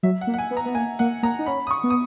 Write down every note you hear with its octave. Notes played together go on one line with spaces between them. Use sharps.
F#3 E5
F#5
A#3
F#5
G#5
B3
A#5
B3
A#3 G#5
A#3 F#5
A#3 A#5
D#4
C#4 B5
D#6
C#6
B3
D#6